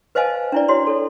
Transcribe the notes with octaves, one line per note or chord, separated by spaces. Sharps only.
B4 C5 D#5 F5 G#5 A5
D4 E4 D5
E4 F#4 C#5 C6
A4 C#5